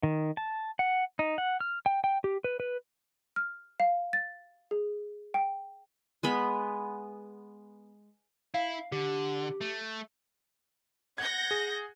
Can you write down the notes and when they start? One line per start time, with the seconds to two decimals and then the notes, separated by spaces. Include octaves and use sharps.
0.03 D#3
0.37 A5
0.79 F#5
1.19 D#4
1.38 F#5
1.60 F6
1.86 G5
2.04 G5
2.24 G4
2.44 B4
2.60 B4
3.36 F6
3.80 F5
4.13 A6
4.71 G#4
5.34 G5
6.23 G#3 B3 B5
8.54 E4 F5
8.92 D3 G4
9.61 A3
11.18 F#5 G6 G#6 A#6
11.51 G#4